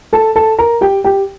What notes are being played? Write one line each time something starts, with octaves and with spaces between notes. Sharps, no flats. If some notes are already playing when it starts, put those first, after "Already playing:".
A4 A5
A4 A5
A#4 A#5
G4 G5
G4 G5